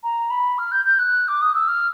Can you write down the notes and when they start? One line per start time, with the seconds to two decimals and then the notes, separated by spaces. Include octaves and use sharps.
0.03 A#5
0.30 B5
0.58 F6
0.71 G6
0.85 G6
0.99 F#6
1.28 D6
1.41 D#6
1.54 E6
1.68 F6